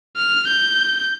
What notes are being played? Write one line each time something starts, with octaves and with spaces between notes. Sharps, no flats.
F6
G6